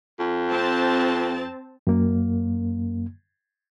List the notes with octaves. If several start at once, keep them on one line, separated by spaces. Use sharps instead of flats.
F2
C4 A5
F#2 A#3